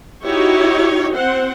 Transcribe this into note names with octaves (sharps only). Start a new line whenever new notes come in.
D#4 E4 F#4 G4 C#5
C4 C5 F#5